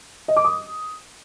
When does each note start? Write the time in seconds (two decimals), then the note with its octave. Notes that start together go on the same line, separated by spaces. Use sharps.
0.28 D#5
0.36 D6
0.45 D#6